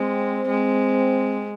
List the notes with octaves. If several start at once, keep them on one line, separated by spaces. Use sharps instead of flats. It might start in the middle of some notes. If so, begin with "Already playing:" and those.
Already playing: G#3 C4
G#3